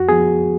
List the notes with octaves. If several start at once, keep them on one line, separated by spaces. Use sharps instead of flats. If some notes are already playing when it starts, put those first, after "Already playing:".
Already playing: F2 F#4
F3 B3 G#4